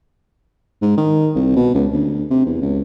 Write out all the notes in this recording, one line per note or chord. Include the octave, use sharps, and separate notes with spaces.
G#2
D#3
C2
B2
C#2
D2
C3
E2
C#2